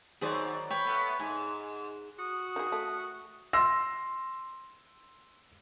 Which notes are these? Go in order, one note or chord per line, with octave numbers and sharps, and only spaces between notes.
D#3 F#3 G#4 C5 D5
B4 C#5 G5
A3 B3
G#2 G#5
F#4 D#6
D#3 G#4
A3
C6 E6 A#6